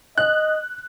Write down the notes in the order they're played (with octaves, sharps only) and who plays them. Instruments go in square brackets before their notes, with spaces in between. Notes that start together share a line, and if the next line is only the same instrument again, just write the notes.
[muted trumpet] D#5 [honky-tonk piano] F#6